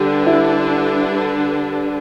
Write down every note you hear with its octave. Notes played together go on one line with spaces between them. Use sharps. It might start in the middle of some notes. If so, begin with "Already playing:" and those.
Already playing: D3 G3 D4 G4 B4
E4